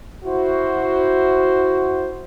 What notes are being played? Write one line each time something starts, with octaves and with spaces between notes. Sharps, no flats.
E4 F#4 C5